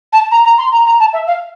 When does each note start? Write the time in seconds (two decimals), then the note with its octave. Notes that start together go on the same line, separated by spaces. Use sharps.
0.12 A5
0.31 A#5
0.44 A#5
0.58 C6
0.72 A#5
0.85 A#5
0.99 A5
1.13 E5
1.27 F5